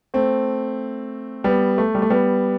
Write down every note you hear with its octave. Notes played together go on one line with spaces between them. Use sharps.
A3 C4
G3 B3
A3
G3
A3
G3 B3